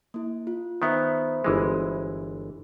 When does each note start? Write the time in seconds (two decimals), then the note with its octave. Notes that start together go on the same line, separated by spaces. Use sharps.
0.14 A#3 E4
0.47 F4
0.82 D#3 B3 C5 E5 B5
1.44 G1 E3 G#3